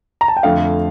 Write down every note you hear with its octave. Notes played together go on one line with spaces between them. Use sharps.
A#5
A5
G5
F2 D3 A3 F5